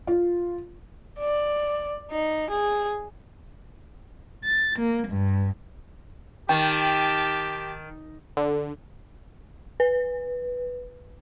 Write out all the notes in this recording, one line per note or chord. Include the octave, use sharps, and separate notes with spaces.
F4
D5
D#4
G#4
A6
A#3
G2
D#3 G4 G5 A5
D3
B4